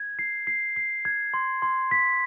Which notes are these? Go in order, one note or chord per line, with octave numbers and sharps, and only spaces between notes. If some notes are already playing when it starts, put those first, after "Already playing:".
Already playing: G#6
C7
C7
C7
G#6
C6
C6
B6